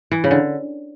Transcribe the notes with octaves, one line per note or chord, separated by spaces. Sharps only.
E3
C#3
D3